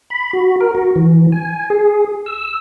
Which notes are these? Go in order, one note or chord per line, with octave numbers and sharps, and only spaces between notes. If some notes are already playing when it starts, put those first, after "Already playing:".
B5
F#4
A#4
F#4
E3
G#5
G#4
E6